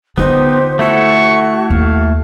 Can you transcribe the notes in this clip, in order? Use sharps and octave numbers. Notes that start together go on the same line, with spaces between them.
D3 B3 D#4 F4 G4 C5
A3 E4 F#4 A4 C#6
D#2 F5